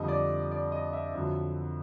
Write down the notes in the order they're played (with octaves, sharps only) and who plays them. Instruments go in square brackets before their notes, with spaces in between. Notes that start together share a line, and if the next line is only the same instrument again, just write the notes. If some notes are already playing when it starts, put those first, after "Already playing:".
Already playing: [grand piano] F2 D3 G3 D#5
D5
D5
D#5
E5
F2 D3 F#3